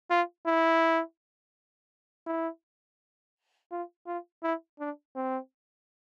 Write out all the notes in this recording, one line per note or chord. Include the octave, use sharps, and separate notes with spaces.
F4
E4
E4
F4
F4
E4
D4
C4